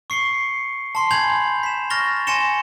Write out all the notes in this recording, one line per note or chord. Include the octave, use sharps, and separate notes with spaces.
C#6 C7 C#7 G7
A5 C6 C7
G#5 B5 G6 G#6 F7 F#7
B6 E7
C#6 F6 A6 A#6 F7 G7
G#5 C6 A#6 C#7 E7 G7